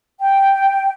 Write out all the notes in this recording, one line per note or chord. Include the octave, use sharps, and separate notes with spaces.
G5